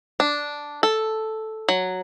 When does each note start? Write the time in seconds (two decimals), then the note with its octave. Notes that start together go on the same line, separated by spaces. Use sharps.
0.20 D4
0.83 A4
1.69 F#3